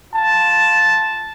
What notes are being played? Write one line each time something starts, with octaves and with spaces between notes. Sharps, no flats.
F4 A5